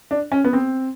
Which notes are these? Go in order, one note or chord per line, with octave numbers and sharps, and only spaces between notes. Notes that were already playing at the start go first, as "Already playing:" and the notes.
D4
C#4
B3
C4